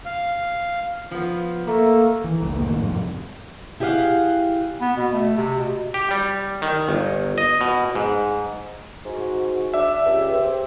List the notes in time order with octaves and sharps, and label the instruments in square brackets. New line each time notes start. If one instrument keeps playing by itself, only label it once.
[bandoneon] F5
[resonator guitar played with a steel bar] F3 B3
[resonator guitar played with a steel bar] A3 [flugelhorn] A#3 [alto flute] A4
[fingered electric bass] E3
C#2 G3 A#3
F#2 A2 D#3 A#3
F2 G#2 C3
[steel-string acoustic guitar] E4 G4 G#4 D5 F5 F#5
[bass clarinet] B3
B2
A3
C3
B2
[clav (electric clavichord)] G4
G3
D#3
G1
D#5
B2
G#2
[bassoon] G#2 [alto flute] F#4
[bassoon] D4 [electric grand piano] E5
[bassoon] C#2 [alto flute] G4
[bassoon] C4